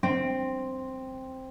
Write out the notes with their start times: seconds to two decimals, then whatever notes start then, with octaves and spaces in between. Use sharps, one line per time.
0.03 C4